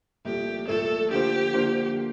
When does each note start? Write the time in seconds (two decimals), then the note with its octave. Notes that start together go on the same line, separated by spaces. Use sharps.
0.25 C2 A#2 F3 A3 G4
0.67 C2 A#2 F3 A3 A4
1.10 D3 F3 A#3 F4 G4 C5
1.54 D3 F3 A#3 F4 C5